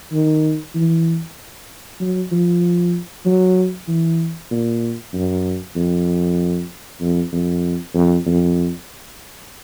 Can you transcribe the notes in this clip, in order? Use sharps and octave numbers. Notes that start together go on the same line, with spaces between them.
D#3
E3
F#3
F3
F#3
E3
A#2
F#2
F2
F2
F2
F2
F2